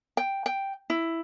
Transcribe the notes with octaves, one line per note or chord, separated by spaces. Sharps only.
G5
G5
E4